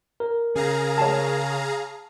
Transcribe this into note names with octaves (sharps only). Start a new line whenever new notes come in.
A#4
C#3 G#4 F5 A#5
C#5 A5